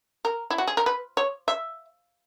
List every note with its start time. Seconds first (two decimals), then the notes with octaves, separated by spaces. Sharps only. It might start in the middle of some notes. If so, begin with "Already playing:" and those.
0.25 A#4
0.51 E4
0.58 F#4
0.67 G#4
0.77 A#4
0.86 B4
1.17 C#5
1.48 E5